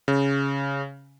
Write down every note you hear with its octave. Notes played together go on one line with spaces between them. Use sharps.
C#3